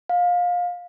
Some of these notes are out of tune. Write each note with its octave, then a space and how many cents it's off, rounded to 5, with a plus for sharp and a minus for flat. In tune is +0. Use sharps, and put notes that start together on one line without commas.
F5 +25